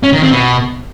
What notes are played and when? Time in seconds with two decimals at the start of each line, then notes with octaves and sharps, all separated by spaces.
0.03 C#4
0.13 D#3
0.22 C4
0.32 B2